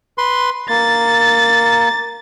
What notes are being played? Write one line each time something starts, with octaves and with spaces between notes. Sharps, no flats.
B4 C6
A#3 A6